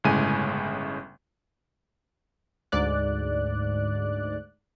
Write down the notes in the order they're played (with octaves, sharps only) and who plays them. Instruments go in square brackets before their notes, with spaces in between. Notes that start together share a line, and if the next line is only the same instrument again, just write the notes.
[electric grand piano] G1 A2 C#3 G#3 G#5 D#7
[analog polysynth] D2 G#2 D5 F#6